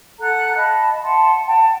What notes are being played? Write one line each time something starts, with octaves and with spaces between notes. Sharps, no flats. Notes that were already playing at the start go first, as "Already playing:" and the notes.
A4 F#5 A#5 F#6
D#5 F5 A5 B5
E5 F#5 A5 C6
F#5 G5 A5